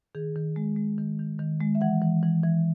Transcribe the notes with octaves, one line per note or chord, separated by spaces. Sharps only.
D#3 G#4
D#3
G#3
G#3
D#3
D#3
D#3
G#3
E5
E3 F#5
E3
E3
E3